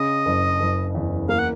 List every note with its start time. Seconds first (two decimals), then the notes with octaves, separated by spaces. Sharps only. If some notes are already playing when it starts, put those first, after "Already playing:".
Already playing: C#3 D#5
0.26 F#1
0.60 F#1
0.95 E2
1.29 A#3 F5
1.39 F#5